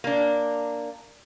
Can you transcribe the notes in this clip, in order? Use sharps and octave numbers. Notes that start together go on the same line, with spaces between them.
A#3 D4